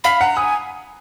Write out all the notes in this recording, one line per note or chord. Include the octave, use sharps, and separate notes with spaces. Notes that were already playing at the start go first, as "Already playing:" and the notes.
F5 B5
F#5 A#5
G#5 D#6